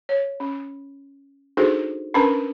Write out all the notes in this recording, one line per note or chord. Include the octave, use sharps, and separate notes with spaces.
C#5
C#4
D4 D#4 F#4 G#4 A4 C5
C#4 D4 A#4 B4 A5 A#5